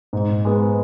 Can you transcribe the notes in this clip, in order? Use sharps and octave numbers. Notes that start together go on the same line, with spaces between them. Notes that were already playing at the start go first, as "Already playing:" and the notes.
G#2
G#3 B3